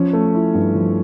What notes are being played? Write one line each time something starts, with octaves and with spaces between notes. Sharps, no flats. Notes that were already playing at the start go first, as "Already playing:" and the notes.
Already playing: F3 C#4
A3
E4
G2
F3